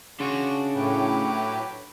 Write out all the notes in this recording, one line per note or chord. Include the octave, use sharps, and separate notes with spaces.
C#3 D4 F#4 C6
A2 F#3 G4 B4